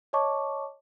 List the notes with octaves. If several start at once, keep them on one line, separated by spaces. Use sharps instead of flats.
C#5 D#5 A5 C#6 D6